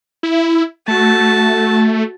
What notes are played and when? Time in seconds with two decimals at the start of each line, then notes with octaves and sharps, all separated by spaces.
0.23 E4
0.88 A3 F#4 A5